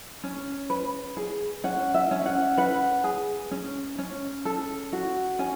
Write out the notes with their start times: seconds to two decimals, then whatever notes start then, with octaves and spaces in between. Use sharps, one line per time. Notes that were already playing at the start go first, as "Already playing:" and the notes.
0.24 C#4
0.70 B4
1.17 G#4
1.64 C#4 F#5
1.94 E5
2.11 C#4
2.26 F#5
2.58 B4 F#5
3.04 G#4
3.51 C#4
3.99 C#4
4.45 A4
4.93 F#4
5.39 C#4 G#5